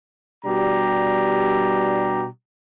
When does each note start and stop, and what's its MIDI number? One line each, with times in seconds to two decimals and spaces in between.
0.45 2.26 47
0.45 2.26 55
0.45 2.26 62
0.45 2.26 67
0.45 2.26 82